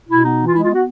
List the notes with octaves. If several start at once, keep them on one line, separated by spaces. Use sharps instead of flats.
B2 E4
B3 D#4
E3
F4
G#3 E4
F4
B3
F#4